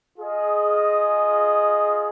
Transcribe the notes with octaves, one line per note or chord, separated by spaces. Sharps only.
F4 G#4 D#5